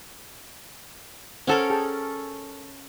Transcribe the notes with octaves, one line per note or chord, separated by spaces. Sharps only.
C#4 A4 A#4 C5 F#5 A5
G#4 G5 A5